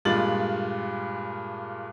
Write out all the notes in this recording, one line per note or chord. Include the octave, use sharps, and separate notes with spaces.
G2 A#2 G#3 F4 A6 F#7